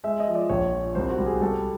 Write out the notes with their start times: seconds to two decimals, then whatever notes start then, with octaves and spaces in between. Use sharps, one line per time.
0.04 G#3 E5
0.20 D#5
0.27 F3
0.35 D5
0.49 A#1 C#5
0.72 F3
0.95 C2 C5
1.10 F#4
1.19 G3
1.26 G#4
1.41 G3 A4